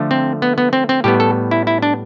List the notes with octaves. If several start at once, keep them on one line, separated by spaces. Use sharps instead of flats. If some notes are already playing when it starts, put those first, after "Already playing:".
Already playing: D3 F3 A3
C4
B3
B3
C4
C4
A2 G3 B3 G4
A4
E4
E4
D4